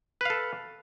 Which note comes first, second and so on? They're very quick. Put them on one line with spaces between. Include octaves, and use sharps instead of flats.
B4 F5 A4